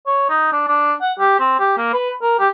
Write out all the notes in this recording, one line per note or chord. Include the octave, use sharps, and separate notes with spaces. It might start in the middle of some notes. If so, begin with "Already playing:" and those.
C#5
D#4
D4
D4
F#5
G4
C4
G4
A#3
B4
A#4
G4